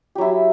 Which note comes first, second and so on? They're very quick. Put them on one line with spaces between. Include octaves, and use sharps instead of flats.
G4 F#3 E4